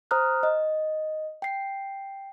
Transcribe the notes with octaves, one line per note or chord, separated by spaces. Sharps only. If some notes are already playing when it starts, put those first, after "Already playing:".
C5 A#5 D#6 F6 F#6
D#5
G5 C7